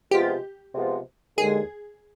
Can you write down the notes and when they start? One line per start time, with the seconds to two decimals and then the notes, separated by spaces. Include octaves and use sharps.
0.11 C3 F3 G#3 B3 F4 G4
0.74 C3 F3 G#3 B3 F4
1.37 D#2 D3 G#3 G#4